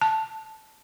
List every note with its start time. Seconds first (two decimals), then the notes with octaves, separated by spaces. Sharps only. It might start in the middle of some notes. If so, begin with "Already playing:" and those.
0.01 A5